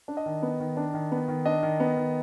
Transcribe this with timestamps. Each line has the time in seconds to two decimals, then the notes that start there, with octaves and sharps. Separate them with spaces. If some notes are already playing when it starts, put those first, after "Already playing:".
0.08 D4
0.17 D#5
0.26 D#3
0.42 B3
0.60 D#3
0.77 D4
0.94 D#3
1.12 B3
1.28 D#3
1.45 D4 D#5
1.63 D#3
1.80 B3
1.97 D#3